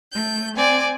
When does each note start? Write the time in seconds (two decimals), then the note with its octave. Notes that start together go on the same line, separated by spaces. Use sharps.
0.11 A3 G6
0.57 C4 D5 G#5